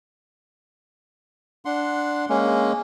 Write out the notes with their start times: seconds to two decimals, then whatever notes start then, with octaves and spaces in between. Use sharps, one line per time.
1.65 D4 F#5 C6
2.29 G#3 A#3 C#4